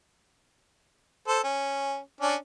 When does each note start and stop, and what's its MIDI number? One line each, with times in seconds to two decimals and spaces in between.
1.28 1.40 69
1.28 1.40 72
1.44 1.98 61
2.21 2.35 61
2.21 2.35 62